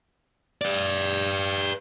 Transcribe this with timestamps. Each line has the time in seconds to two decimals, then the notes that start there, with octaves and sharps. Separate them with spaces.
0.62 B4 D5